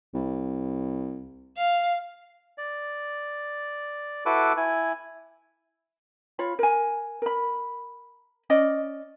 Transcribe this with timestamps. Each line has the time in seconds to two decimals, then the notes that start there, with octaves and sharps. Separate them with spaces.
0.14 C2
1.57 F5
2.58 D5
4.26 E4 F#4 A4 B4 D6
4.57 E4 G#5
6.39 F4 C#5 B5
6.59 A#4 G#5
7.22 A#4 B5
8.50 C#4 D5 D#5